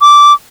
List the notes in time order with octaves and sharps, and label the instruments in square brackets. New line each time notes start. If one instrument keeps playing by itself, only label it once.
[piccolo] D6